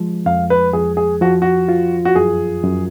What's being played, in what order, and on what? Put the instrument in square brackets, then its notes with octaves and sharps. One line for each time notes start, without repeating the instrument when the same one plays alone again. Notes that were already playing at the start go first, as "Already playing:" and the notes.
Already playing: [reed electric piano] F3 G#3
[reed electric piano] F2 [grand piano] F5
[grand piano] B4
[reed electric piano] F2 [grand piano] G#4
[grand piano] G#4
[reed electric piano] F3 [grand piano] F#4
[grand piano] F#4
[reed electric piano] F4
[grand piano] F#4
[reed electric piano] F#2 [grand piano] G#4
[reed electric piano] F#2